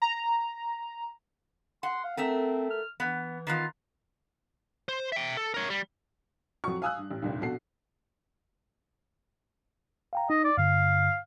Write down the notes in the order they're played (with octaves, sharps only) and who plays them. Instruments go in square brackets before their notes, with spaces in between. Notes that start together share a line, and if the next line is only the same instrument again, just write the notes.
[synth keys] A#5
[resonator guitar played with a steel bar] F#5 [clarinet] C6
[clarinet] F5
[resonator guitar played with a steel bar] A3 A#4 E5 [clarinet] C4
[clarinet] F6
[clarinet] E3 [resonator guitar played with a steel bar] B3
[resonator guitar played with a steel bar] D#3 B3 F4
[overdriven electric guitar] C5
E5 G5
A4
A#4 C#5
G3
[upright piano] F2 F#3 F#4 C#6
F5 G#5 D#6 E6 F#6
G2
A1
F1 A#1 D#2
A#1 B2 F#4 A4 C7
[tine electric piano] F5 G5 A#5
[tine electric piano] D#4 [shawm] D#5
[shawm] D5
[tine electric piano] G2 D3 [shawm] F5